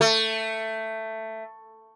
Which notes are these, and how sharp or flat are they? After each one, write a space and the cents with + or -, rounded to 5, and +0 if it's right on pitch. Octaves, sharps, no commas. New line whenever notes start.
A3 +10